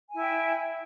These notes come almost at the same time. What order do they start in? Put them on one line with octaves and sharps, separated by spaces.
G#5 E4 E5 G5